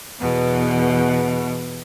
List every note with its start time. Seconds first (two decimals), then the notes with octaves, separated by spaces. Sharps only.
0.19 E2 B2